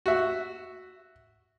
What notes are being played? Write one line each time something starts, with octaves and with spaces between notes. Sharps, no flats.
F#4 E5